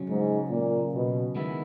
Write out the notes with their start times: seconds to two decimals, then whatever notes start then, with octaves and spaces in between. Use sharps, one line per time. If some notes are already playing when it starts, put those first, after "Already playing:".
Already playing: C#3 F#3 C#4
0.08 G#2
0.51 A#2
0.93 B2
1.35 D#3 G#3 B3 E4